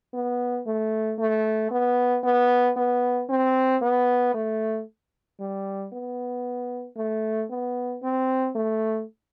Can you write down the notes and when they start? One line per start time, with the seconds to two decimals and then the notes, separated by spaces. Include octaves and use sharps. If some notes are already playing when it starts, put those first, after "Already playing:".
0.14 B3
0.67 A3
1.19 A3
1.71 B3
2.24 B3
2.77 B3
3.29 C4
3.82 B3
4.34 A3
5.40 G3
5.93 B3
6.97 A3
7.50 B3
8.03 C4
8.55 A3